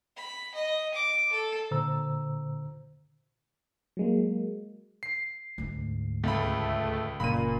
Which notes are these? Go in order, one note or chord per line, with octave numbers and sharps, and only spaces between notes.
B5
D#5
D6
A4
A#2 D3 C5 A#5 E6
F#3 G#3 A#3
C7
D2 G#2
C#2 A3 B5
F#1 A#2 F3 B5 D#7